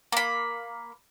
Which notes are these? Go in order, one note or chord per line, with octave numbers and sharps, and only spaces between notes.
A#3 B5